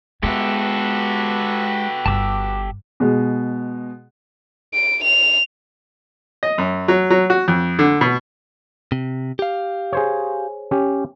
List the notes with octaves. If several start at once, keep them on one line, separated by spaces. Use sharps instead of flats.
G#3 B3 F#4 G4 A4 B4 E5
G1 A5 D6 E6
B2 G#3
D7
F7
D#5
F#2
F#3
F#3
F#4
F2
D3
B2
C3
G4 F5
G#4 C5 C#5
C#4 G4